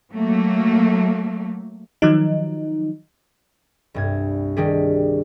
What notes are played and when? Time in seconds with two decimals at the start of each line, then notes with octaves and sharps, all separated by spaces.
0.13 F#3 A3 A#3
2.02 D#3 F3 F#3 D#4
3.94 C2 G2 G#6
4.56 D#3 G3 D4 G4 G#4